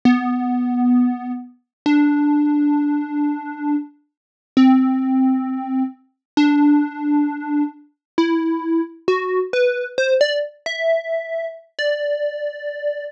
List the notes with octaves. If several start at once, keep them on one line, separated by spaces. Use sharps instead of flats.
B3
D4
C4
D4
E4
F#4
B4
C5
D5
E5
D5